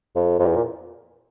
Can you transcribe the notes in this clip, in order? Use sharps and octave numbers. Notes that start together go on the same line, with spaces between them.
F2
F2
E2
A#2